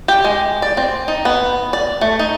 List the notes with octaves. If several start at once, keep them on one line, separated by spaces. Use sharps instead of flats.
G4
G#3
D5
C4
D#4
B3
D5
A3
D#4